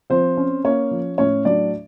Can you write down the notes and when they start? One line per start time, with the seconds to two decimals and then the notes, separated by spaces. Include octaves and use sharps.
0.10 F3 C4 C5
0.37 C#4
0.64 A#3 C#4 C#5
0.91 F3
1.18 A2 C#4 C#5
1.45 F#3 D4 D5